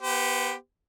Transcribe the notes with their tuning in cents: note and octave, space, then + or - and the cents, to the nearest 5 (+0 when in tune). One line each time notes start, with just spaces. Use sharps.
B3 -20 G4 +0 C5 -45